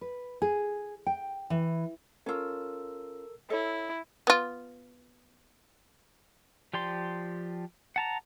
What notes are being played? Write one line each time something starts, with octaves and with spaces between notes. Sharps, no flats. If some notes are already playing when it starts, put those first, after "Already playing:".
B4
G#4
G5
E3
C#4 F4 A4 A#4 E6
E4 A4 C#5
B3 F4
F3 G4 D5 C6
F#5 A5 A#5